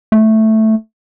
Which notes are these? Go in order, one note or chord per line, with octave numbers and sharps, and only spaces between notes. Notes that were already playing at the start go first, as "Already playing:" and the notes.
A3